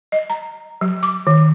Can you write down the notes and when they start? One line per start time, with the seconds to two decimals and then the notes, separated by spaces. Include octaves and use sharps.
0.12 D#5
0.30 A#5
0.81 F#3
1.03 D6
1.27 D#3